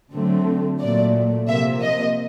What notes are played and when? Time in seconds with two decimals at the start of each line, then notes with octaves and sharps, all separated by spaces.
0.12 D3 F#3 A3 C4
0.80 A#2 F#3 A3 D5
1.48 C3 F3 A#3 E5
1.82 D#5